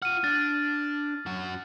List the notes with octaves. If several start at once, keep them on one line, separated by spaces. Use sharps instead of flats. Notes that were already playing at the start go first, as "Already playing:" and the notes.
F4 F#5 F6 D#7
D4 A6
F#2 F#4